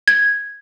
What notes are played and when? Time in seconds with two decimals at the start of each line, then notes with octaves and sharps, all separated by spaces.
0.08 G#6